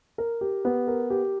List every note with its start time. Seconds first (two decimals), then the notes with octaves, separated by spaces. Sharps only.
0.18 A#4
0.41 G4
0.65 B3
0.88 A#4
1.10 G4